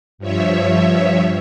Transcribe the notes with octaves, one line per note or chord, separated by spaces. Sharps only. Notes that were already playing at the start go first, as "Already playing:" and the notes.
G2 F3 C#5 E5